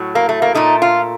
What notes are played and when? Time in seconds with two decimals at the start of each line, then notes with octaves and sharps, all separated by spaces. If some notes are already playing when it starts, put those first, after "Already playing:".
Already playing: A2 F#3
0.15 A#3
0.29 A3
0.42 A#3
0.55 A#2 A3 D#4
0.82 F4